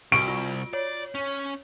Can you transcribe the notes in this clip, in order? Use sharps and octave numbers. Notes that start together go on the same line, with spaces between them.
C2 F#4 C#6 D7
F4
C#5 D5
C#4